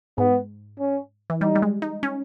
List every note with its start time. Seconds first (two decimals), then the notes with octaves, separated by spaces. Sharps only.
0.18 G#2 B3
0.80 C#4
1.30 E3
1.41 G3 D#4
1.55 G3
1.62 G#3
1.82 D#4
2.03 C#4